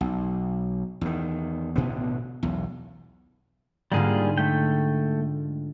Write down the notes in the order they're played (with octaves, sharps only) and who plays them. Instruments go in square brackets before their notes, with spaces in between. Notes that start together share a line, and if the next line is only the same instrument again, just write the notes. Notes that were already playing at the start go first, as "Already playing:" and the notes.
[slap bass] B1
E2 D#3
A1 B2 D3 B3
B1 E2
[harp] G#2 D3 F4 [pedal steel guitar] G3 A#3 G#4
[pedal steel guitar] A3 G5